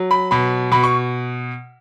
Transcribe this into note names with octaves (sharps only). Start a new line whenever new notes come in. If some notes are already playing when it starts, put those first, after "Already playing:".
Already playing: F#3
B5
B2 B5
B2 B5
C#6